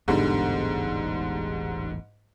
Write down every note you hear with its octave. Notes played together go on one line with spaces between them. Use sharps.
E1 A1 G#2 D3 G3 B3